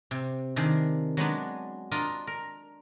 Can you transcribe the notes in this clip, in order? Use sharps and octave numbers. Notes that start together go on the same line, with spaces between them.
C3
C3 D#3 D4 G#4
F#3 G#3 B3 D4
D4 F4 A#4 D#5
A#4